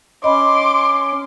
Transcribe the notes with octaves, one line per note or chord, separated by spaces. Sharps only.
C#4 D#5 B5 C6 D6